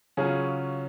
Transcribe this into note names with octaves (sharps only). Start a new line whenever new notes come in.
C#3 F#3 C#4 F4 G#4